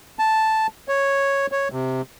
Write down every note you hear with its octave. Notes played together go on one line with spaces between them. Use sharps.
A5
C#5
C#5
C3